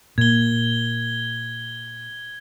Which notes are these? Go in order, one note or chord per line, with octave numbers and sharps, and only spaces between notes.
A#2 G#6 G7